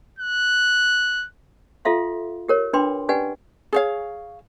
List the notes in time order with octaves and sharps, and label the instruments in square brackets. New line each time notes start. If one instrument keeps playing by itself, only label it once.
[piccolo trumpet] F#6
[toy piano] F4 A4 E5 F5 C6
G4 A#4 C#5
D4 B4 G5 B5 C6 D6
C#4 G4 B4 D5 F#5 G#5
[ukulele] G#4 C#5 F5